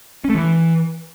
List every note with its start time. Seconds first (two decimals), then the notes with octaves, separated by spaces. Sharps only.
0.25 C#4
0.30 A3
0.35 E3